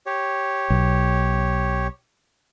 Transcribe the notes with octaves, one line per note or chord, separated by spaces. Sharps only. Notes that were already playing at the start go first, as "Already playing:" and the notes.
G4 C#5
B1